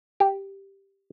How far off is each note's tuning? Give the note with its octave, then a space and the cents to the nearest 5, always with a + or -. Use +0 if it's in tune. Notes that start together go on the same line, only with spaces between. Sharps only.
G4 +0